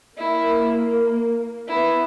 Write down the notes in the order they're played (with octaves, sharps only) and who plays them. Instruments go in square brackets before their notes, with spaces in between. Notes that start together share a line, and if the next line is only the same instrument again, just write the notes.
[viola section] A#3 [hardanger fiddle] E4
[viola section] B3 [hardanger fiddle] E4